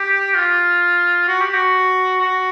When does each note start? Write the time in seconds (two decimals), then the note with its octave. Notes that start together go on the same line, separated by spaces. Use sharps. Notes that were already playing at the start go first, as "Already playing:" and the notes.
Already playing: G4
0.35 F4
1.28 F#4
1.41 G4
1.54 F#4
2.21 F#4